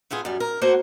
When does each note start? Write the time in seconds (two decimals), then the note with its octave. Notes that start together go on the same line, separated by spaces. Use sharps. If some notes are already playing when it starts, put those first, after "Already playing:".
0.11 A3 B3 F4 G#4
0.25 F#2 G3
0.40 A#4
0.61 A3 A#3 F#4 C5 F#5